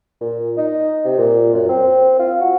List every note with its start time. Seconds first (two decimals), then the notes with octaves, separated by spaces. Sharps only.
0.21 A#2
0.57 D#4
1.05 C3
1.18 A#2
1.54 F#2
1.69 C4
2.19 F4
2.40 F#4